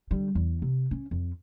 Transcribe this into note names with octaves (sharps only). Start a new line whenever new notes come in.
D3 G3
E2
C3
C#4
F2